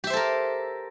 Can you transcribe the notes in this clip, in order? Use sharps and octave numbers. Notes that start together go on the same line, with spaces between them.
G4 A4 A#4 C5 E5